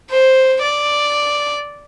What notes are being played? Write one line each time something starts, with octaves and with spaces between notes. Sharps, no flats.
C5
D5